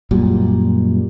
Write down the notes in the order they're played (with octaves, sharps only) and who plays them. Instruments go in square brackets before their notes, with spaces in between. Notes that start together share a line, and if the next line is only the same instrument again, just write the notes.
[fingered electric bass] F#2 A#2 G3